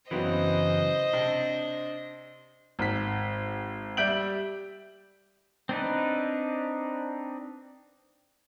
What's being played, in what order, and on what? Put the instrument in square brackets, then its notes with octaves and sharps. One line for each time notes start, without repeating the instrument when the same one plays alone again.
[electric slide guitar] F#2 C#3 E3 [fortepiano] F#3 B3 C4 [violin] C5 D#5
[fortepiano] C3 [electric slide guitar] D4
[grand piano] G#1 B6
G3 E5 G6 D7 F#7
[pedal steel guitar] C4 D4 D#4 B4